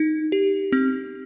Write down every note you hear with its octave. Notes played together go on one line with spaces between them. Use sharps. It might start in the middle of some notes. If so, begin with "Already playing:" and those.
Already playing: D#4
G4
C4